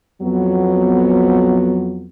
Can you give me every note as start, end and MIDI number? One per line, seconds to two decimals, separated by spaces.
0.21 2.07 41
0.21 2.07 54
0.21 2.07 59